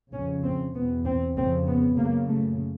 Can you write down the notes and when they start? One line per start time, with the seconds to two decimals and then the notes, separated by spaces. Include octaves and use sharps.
0.13 F2 C#3 C#4
0.44 C4
0.75 E2 B2 B3
1.05 C4
1.36 C#3 C4
1.41 F2
1.67 B3
1.98 F#2 C#3 A#3
2.28 A3